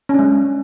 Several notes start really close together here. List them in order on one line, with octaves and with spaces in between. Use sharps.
C#4 D4 G#3